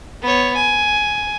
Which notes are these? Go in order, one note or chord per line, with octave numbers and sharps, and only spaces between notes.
B3 C#5
G#5